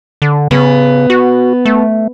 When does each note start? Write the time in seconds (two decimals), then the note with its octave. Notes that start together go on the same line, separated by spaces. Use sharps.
0.22 D3
0.51 C#3 B3
1.10 F#4
1.65 A3